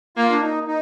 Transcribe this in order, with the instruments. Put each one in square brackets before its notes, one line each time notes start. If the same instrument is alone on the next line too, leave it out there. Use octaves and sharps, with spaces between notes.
[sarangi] A#3 [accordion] F4
[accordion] D4
D#4
D#4